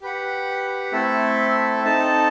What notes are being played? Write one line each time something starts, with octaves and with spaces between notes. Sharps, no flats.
G4 B4 F#5
A3 C4 E4 A4 E5
C4 D#4 A4 D#5 A5